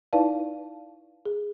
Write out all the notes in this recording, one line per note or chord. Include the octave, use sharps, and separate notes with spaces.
D#4 E4 B4 D5 F5 A5
G#4